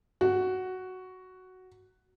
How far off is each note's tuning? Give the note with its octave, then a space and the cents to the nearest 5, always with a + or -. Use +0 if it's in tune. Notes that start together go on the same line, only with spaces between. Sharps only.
F#4 +5